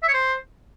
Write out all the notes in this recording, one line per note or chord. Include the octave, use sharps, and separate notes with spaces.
E5
C#5
C5